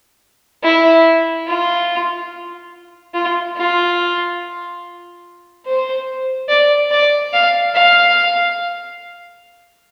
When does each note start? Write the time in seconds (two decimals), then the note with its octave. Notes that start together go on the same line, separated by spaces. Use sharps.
0.64 E4
1.48 F4
3.14 F4
3.57 F4
5.66 C5
6.49 D5
6.92 D5
7.33 F5
7.75 F5